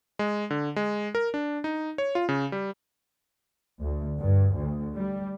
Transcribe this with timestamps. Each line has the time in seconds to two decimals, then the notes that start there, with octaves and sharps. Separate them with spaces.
0.19 G#3
0.50 D3
0.76 G#3
1.15 A#4
1.34 D4
1.64 D#4
1.98 C#5
2.15 F4
2.29 C#3
2.52 G3
3.80 D2
4.20 G2
4.55 D2
4.96 G3